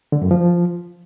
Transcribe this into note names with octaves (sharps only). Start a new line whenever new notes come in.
D3
F#2
F3